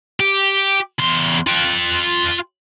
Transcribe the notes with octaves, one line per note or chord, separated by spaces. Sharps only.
G4
E2 C6
F4 G5